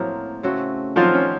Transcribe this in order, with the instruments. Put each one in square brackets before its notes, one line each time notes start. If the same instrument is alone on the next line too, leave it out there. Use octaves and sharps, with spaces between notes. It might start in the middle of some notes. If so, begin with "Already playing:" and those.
Already playing: [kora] A2 F#3 A#3 C4 [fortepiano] F3
[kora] C#3 A3 C4 F#4
[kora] D#3 F#3 C4 F#4 [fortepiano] F3 F4
[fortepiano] C#4